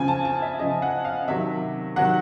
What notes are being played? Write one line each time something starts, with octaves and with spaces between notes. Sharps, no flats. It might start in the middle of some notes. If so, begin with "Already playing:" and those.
Already playing: C#3 F3 G#5
A5
A5
E5
C#3 F3 D#5
F#5
F5
C3 D#3 F#3 E5
C3 D#3 F#3 F#5